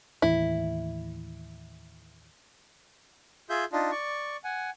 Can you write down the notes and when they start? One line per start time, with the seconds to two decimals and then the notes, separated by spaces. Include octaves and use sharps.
0.22 D#2 A2 E3 E4
3.50 F4 G#4 E5 G6
3.72 D4 D#4 F4
3.91 D5 C#6
4.44 F#5 G#5